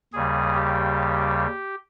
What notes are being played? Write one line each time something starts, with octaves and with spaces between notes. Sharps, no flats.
D#2 C#3 G3 G#4
G4